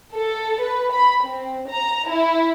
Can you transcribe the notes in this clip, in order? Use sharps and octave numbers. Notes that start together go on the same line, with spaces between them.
A4
B4
B5
C4
A#5
E4